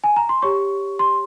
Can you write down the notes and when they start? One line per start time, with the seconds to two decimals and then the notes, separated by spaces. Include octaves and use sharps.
0.04 G#5
0.16 A#5
0.29 C6
0.42 G4 C#5 C#6
0.99 C6